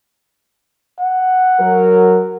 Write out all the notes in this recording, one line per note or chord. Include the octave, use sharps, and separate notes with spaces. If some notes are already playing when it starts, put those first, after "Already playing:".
F#5
F#3 A#4